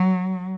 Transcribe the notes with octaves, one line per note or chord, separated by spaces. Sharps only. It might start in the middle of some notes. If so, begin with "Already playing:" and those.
Already playing: F#3